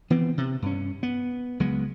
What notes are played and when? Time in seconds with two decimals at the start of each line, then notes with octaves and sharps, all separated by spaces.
0.10 E3 B3 C4
0.38 C3
0.62 G2 C#4
1.03 B3
1.60 C#2 F#3 G#3 B3